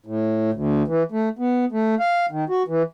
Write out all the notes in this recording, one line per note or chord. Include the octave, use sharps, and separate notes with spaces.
A2
D2
E3
A3
B3
A3
F5
D#3
F#4
E3